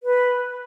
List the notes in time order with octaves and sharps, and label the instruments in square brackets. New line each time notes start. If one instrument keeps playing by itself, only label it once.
[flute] B4